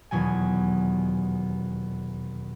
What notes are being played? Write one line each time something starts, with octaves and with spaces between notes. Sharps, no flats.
D#1 E2 B2 F#3 G#5